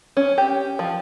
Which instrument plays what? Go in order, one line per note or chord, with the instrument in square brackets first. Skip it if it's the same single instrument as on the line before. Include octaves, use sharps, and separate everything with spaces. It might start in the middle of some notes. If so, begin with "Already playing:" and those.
[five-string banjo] C#4
G4
F3